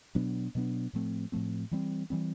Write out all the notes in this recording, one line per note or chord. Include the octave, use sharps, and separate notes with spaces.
B2 F#3 B3 D4
B2 F#3 B3 D4
A2 F3 A3 C4
A2 F3 A3 C4
E3 G3 C4
E3 G3 C4